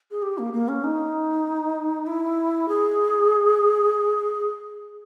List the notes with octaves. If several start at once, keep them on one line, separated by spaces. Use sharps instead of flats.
G#4
G4
A#3
A#3
C#4
D#4
E4
G#4